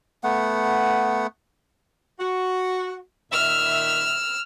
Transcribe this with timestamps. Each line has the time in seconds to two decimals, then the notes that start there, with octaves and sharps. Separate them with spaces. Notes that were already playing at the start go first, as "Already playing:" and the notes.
0.24 A3 B3 F#5
2.20 F#4
3.32 A#2 D#3 E5 E6 F6